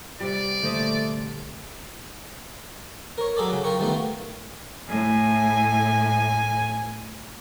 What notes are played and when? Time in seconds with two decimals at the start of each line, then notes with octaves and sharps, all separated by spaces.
0.20 C3 G3 D5
0.63 A#1 D3 A3 A#3 C5 D#5 E5
3.18 A#4 C#5
3.37 F#3 G#4 A4 D5
3.50 C#3 F#3
3.64 F4 A#4 G5 C#6
3.79 D#3 G3 A3 B3 F4
4.89 A2 G#5